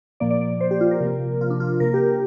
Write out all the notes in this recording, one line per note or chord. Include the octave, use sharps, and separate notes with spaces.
A#2 F3 A#3 D5
D5
D5
C5
G4
F4
A#4
C3 F3 A#3
F4
D4
F4
C3 A#3 A#4
G4